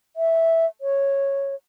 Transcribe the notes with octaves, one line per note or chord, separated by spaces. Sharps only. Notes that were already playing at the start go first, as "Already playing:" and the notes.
E5
C#5